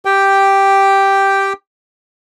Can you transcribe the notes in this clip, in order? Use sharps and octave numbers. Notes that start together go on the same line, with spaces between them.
G4 G5